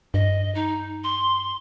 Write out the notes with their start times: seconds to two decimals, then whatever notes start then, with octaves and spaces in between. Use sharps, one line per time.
0.14 G2 D#5
0.55 D#4
1.04 C6